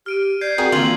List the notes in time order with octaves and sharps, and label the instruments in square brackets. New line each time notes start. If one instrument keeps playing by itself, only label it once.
[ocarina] G4 [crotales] F6 D7 D#7
[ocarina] D5 [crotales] G6 G#6 C7
[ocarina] C4 [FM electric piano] F#4 A#4 G5 [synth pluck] G#4
[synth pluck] D3 F4 [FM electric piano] E3 A#3 [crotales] F#7